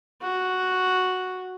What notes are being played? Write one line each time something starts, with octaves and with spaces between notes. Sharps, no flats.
F#4